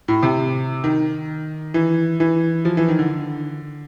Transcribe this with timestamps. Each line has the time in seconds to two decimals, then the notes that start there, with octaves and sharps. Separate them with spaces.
0.08 A2
0.23 C3
0.84 D#3
1.74 E3
2.20 E3
2.65 F3
2.77 E3
2.89 D#3
2.99 D3